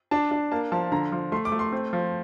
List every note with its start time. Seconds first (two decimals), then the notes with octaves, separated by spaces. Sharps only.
0.11 D4 A5
0.31 D4
0.52 A#3 A5
0.72 F3 A5
0.92 D3 A#5
1.12 F3
1.32 A3 C6
1.45 D6
1.52 A3
1.59 C6
1.72 C4
1.93 F3